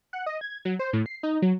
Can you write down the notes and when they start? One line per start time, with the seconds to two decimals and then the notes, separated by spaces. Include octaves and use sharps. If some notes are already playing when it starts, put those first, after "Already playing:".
0.13 F#5
0.26 D#5
0.41 G#6
0.65 F#3
0.79 C5
0.93 A2
1.06 C7
1.23 D#4
1.42 F#3